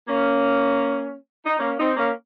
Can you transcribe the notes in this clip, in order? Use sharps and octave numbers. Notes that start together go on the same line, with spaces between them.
A#3 C#4
D#4
A#3 C#4
C4 D#4
A#3 C#4